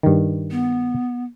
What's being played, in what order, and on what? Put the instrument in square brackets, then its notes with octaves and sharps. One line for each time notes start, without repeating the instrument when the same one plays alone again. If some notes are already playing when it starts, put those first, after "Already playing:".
[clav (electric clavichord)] G2 D#3
[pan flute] B3